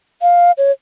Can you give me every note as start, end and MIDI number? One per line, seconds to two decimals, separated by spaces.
0.22 0.51 77
0.58 0.71 73